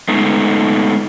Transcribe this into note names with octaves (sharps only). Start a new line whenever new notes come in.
G#3 A3 B3 D#4